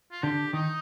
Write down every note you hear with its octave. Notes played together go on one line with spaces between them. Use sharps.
F4
D3 G4
D#3 D#4